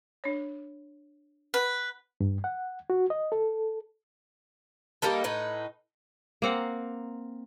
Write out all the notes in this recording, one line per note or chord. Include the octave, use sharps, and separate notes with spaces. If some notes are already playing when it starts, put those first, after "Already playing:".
D4 C#5
B4 F#5
G2
F#5
F#4
D#5
A4
G3 A#3 D#4 A4
A2 D#4 B4
A#3 C4 F#5